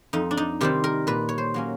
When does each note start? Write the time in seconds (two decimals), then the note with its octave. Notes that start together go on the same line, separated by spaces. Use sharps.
0.13 F2 D#4
0.31 D4
0.37 D#4
0.61 C3 D#3 G3 C4 G4
0.84 A#4
1.07 A#2 B4
1.29 C#5
1.38 C5
1.54 F#3 A#3 C#4